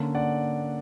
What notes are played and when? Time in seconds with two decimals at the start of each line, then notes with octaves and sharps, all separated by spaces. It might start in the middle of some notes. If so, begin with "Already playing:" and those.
Already playing: D3 A#3 C#4
0.15 D5 F#5